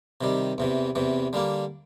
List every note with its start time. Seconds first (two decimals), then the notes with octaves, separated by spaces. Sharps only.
0.21 C3 D#3 G3
0.58 E2 C3 E3
0.95 E2 C3 E3
1.33 D3 G3 A#3